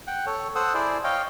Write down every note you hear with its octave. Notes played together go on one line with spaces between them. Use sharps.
F#5 G5
A4 C#5
A4 C5 F#5 D#6 E6
E4 G#4 C5 D5
C#5 D#5 F5 G5